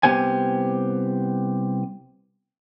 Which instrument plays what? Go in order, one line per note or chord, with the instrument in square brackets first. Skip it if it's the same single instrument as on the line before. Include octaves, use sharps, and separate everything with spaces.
[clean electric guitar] C2 B2 B3 G4 C5 G#5